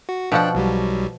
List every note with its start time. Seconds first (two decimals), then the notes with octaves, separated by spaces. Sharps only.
0.09 F#4
0.32 B2 F3 D4 F#5 G5 F#6
0.55 B1 F#3 G3